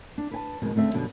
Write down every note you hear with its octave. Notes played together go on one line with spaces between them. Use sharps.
D4
B4 G#5 A5
F2 B2 D#3 G#3
D2 C#3 A3 C4 E5
F#2 B2 D3 G3